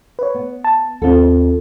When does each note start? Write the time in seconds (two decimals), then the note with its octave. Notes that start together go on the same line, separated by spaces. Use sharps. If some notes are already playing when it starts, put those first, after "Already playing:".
0.19 B4 C#5
0.34 B3
0.64 A5
1.02 D#2 C4 F4 A4